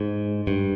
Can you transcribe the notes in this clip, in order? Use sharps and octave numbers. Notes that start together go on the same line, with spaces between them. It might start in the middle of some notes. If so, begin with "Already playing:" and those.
Already playing: G#2
G2